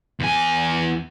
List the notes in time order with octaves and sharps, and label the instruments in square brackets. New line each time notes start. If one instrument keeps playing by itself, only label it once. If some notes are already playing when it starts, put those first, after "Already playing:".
[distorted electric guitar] E2 G#5